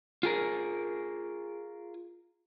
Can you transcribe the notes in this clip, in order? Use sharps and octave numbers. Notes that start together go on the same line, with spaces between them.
F4 G#4 A#4